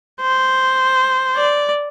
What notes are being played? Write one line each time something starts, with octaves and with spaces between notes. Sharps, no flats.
C5
D5